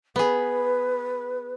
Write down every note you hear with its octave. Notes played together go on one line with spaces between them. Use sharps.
B3 G#4 B4